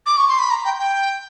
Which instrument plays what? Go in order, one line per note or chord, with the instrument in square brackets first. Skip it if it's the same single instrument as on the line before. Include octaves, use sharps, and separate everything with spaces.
[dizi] D6
C#6
C6
B5
A#5
G5
G5